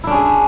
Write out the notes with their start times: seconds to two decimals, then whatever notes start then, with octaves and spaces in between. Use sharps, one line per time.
0.04 E4
0.07 D4
0.11 C#4
0.14 G#4